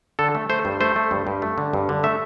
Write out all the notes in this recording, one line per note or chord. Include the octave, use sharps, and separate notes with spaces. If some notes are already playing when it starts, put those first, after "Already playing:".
D3 A4
A3
A3 C5
G2
A3 C5
A3
G2
G2
A3
D3
G2
D3
A3 E5